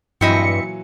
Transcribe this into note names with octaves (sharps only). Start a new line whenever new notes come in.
G2 A#2 E3 F#3 C4 E4 D#5 C#7